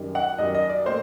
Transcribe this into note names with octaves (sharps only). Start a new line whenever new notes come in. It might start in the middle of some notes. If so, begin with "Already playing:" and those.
Already playing: F#2 D#3 G3
F#5
F#2 D#3 G3 D#5
D#5
D5
A#2 A3 C5